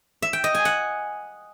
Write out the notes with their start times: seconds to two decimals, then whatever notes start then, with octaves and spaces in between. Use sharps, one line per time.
0.22 E5
0.33 G5
0.44 D#5
0.55 G#5
0.65 F#5